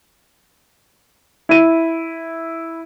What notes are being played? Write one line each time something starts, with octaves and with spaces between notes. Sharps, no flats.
E4 D#7